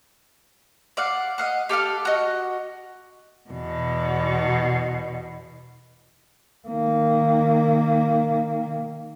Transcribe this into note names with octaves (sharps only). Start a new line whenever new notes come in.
D5 F5 F#5
D#5 F5 F#5
G4 A4 F5 F6
F#4 D#5
E2 B2
D#3 A#3